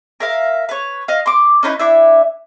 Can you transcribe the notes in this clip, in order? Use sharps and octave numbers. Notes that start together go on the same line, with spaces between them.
A#4 E5 F5
B4 C#5
D#5 F5
C6 D6
C#4 D#4 E4 B4
D4 E4 E5